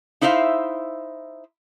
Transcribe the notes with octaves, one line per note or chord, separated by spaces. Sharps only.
D#4 E4 C5 E5 F5